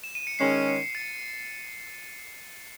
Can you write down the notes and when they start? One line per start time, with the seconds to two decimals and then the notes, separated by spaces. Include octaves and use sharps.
0.04 E7
0.15 D#7
0.27 C#7
0.39 D#3 G#3 C#4 G#4 C7
0.95 A6 C#7